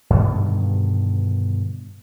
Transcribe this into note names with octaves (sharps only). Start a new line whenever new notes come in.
G2 B2 D3 D#3